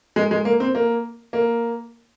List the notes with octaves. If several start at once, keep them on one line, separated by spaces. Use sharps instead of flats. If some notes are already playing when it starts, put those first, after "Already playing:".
G#3
G#3
A#3
C4
A#3
A#3